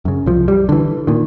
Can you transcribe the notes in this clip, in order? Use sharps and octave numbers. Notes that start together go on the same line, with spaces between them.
F#2 C#3
C2 F3
G3
D3 E3
A#2 D#3